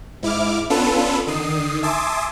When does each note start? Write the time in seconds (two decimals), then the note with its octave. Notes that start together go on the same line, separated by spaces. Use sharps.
0.22 G#2 E4 D6 F6
0.70 B3 C#4 D4 F4 A4 B4
1.27 D3 D#3 D#6 C7
1.83 E5 G#5 A5 C6 D6 D#6